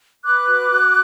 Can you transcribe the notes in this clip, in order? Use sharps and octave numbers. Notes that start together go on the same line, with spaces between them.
B4 D6 F#6
F#4
F#4